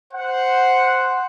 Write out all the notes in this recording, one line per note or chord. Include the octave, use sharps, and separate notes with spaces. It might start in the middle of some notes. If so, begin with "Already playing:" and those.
C5 F#5